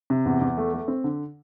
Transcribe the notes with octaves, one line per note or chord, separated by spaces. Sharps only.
C3
E2
E2
A3
A3
C4
D3